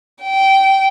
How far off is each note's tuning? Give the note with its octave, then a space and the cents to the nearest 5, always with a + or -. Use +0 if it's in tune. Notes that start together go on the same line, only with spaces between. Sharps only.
G5 -20